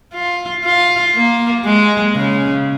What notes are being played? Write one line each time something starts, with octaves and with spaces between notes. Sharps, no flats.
F4
F4
A#3
G#3
C#3